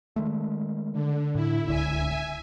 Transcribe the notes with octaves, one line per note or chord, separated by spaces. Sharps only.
D#3 G#3 A3
D3
A2 E4
D1 C#2 D3 E5 G#5